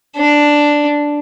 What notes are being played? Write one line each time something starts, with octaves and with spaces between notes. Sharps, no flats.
D4